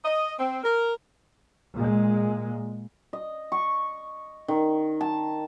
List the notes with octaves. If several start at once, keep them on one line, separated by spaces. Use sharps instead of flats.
D#5
C4
A#4
A#2 G#3
D#5
C#6
D#3
A5